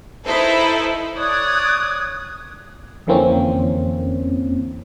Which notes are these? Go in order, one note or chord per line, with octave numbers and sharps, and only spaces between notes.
D#4 E4 A4 B4 C5
C#5 D5 D#6 F#6 G#6
F2 D3 E3 A#3 C4 C#4